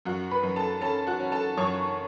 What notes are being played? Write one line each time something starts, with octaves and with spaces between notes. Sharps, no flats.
F#2 F#4 F#5
B4 B5
F#2
A4 A5
C#4 A4 A5
F#4 F#5
C#4
A4 A5
F#2 C#5 C#6